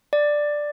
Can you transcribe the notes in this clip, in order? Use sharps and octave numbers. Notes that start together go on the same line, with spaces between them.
D5